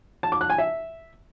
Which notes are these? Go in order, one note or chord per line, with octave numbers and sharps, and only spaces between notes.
A5
D6
F#6
G#5
E5